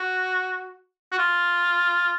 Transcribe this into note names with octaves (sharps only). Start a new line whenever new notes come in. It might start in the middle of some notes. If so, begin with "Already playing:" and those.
Already playing: F#4
F#4
F4